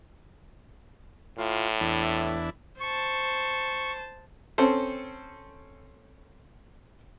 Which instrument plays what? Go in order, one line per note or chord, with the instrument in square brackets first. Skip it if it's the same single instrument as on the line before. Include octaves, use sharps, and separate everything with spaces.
[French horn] A2 [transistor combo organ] F4
[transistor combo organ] E2 D4 E4
[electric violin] C5 A5 [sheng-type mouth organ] C#6
[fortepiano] C4 C#4 A4 C5